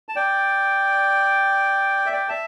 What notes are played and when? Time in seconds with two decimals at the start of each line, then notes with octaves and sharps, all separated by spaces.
0.09 A5
0.16 D5 G5
2.06 E5
2.13 D5 G5
2.29 E5 A5